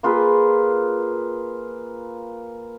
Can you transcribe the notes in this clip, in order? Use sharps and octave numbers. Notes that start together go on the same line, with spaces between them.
A#3 F4 G#4 B4